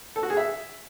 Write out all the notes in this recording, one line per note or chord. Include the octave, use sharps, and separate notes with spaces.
A4
F#4
G#4
E5